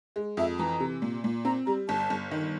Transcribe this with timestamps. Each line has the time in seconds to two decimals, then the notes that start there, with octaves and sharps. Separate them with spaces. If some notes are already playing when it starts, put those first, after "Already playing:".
0.16 G#3
0.37 F2 E5
0.59 E3 A#5
0.80 C3
1.02 A#2
1.24 A#2
1.45 C4 A#5
1.66 G3 A#5
1.88 G1 A5
2.10 G1
2.31 D#3